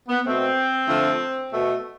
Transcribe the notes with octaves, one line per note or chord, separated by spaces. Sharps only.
B3
B2 A3 C4
D3 F3 A3
B2 A3